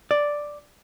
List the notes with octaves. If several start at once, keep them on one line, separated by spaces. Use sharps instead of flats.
D5